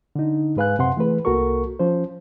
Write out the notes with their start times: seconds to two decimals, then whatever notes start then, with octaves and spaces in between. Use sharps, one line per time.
0.16 D3 D#4
0.56 G#2 G#3 B4 F5 G#5 F#6
0.78 F#2 C3 F#5 C6
0.97 E3 A3 G#4 B4
1.25 C2 A#3 F#4 A4 A#4 C#6
1.79 F3 C#4 C5